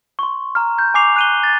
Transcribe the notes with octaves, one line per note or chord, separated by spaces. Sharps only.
C6 C#6
A#5 F6
G6
G#5 C#6 D6 C7 F7
F#6 D#7 G7
A6